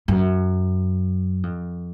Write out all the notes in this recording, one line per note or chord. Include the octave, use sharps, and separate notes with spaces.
F#2
F2